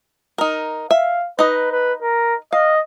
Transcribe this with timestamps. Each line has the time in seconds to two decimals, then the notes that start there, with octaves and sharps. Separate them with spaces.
0.38 D#4 A#4
0.91 E5 F5
1.39 D#4 B4 D#5
1.72 B4
2.02 A#4
2.53 D#5 F5